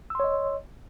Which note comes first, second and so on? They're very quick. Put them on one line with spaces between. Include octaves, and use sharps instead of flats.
E6 C6 C#5 D#5